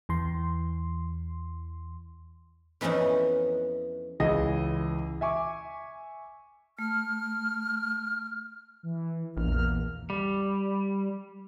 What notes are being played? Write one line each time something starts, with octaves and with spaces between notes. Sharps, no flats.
E2 E3 C6
F2 E3 F3 B3 C#4 D#4
C#2 E3 G#4 D#5 A#6
E5 G#5 C#6 D6
A3 F6
E3
A#1 E2 A#2 A#3 F6
G3